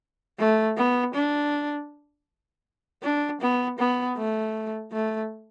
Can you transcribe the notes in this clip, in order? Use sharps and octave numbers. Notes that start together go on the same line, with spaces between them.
A3
B3
D4
D4
B3
B3
A3
A3